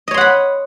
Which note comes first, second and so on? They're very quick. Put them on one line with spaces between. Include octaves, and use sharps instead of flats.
D#5 C#5 C6 F#5 B5